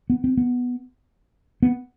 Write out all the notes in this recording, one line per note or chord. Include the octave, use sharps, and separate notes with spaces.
B3
C4
B3
B3